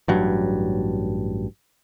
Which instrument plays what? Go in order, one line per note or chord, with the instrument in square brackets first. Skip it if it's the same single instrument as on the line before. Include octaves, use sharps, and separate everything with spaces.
[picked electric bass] A1 G2 F#3